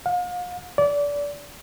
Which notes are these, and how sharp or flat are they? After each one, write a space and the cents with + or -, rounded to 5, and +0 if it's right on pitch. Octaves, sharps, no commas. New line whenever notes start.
F5 +40
D5 -25